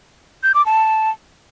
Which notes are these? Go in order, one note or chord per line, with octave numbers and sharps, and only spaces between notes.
G6
D6
A5